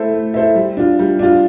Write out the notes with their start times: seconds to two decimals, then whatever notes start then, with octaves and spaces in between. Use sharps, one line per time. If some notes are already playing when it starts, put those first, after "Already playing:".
Already playing: A3 E4 A4 C5 E5
0.14 A3
0.34 E4 A4 C5 E5
0.55 G3
0.77 D4 F4
0.99 G3
1.19 D4 F4